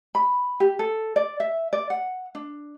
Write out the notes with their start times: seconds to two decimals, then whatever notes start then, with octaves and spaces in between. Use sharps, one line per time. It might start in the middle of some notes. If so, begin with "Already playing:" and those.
0.15 B5
0.60 G4
0.79 A4
1.16 D5
1.40 E5
1.73 D5
1.90 F#5
2.35 D4